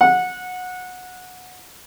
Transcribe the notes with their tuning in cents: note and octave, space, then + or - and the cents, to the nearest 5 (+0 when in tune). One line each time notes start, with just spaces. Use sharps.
F#5 -20